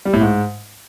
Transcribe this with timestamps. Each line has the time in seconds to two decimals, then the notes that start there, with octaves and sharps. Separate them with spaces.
0.05 G3
0.13 A2
0.21 G#2